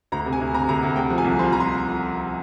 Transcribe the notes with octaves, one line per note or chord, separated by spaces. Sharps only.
D2 A#5
C3
G#5
D2
C3 A#5
D2 A#5
D2
C3 G5
F3
G#5
C2
F3 C6
F3 A#5
C6